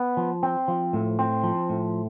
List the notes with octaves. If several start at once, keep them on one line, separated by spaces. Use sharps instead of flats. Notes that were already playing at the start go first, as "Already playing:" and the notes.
Already playing: B3
F3
C4
F3
A2
C4
F3
A2